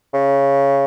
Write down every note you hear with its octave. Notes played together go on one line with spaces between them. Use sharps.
C#3